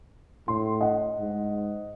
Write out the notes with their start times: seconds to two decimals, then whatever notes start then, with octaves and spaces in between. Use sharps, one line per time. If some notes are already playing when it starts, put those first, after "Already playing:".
0.48 A2 C6
0.81 D#5 F#5
1.20 G#2